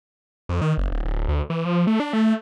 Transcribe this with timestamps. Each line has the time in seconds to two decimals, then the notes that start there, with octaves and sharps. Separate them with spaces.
0.49 F2
0.62 D#3
0.78 F#1
0.92 D1
1.05 D1
1.29 D2
1.50 E3
1.65 F3
1.87 A3
2.00 D4
2.13 A3